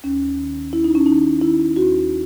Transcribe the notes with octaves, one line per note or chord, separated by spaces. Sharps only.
D#2 C#4
D#3
D#2 E4
D#4
C#4
D#3 D#4
D#3 E4
D#2 F#4